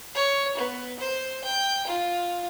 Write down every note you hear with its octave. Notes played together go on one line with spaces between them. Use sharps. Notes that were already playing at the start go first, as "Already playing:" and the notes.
C#5
B3
C5
G5
F4